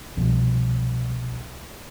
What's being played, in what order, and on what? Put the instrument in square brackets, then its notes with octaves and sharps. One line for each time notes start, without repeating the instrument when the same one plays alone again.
[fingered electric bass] C2 B2 F3